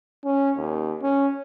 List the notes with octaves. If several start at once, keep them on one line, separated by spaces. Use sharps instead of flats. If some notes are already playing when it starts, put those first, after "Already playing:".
C#4
D#2
C#4